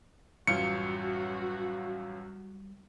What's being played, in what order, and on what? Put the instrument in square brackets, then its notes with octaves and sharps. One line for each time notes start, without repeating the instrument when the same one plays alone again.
[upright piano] A1 F#2 F4 [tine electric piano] G3 [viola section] F#4 [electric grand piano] C#7